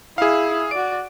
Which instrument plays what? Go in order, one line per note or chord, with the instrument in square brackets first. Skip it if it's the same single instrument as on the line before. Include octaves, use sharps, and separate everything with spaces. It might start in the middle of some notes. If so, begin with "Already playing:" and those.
[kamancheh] E4 [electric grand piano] G#4 F5
[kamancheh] F#4 D5 [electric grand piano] D7